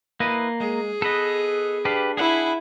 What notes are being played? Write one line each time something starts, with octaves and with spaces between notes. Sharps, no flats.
A#3 E4 B4 D#5
G#3 G#4
B3 A4 B4 D#5
D4 G4 B4 F5
E4 G#4 F#5 G#5 B5